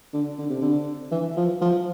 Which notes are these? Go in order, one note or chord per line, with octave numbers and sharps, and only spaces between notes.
D3
D3
C3
D3
E3
F3
F3